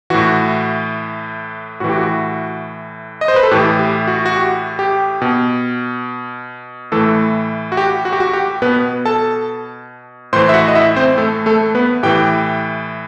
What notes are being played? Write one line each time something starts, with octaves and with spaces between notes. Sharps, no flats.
A2 E3 F#4
A2 E3 F#4
G4
F#4
D#5
C5
B4
A4
A2 E3 G4
G4
F#4
F#4
G4
G4
B2
A2 E3 A3 A4
F#4
G4
F#4
G4
F#4
G4
B2 B3 B4
A4 A5
A2 E3 C5 C6
E5
F#4 F#5
D#5
E4 E5
C4 C5
A3 A4
A3 A4
B3 B4
A2 E3 G4 G5